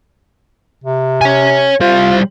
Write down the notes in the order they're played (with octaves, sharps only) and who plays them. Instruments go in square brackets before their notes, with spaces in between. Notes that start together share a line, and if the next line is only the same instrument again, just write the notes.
[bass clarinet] C3
[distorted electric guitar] C#5 G#5
[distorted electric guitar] G3 C5 [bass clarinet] F4